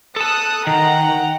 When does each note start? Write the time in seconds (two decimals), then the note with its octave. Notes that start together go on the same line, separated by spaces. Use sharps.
0.16 A4 A5 D#6 F#6
0.67 D#3 F#5 G5 A#5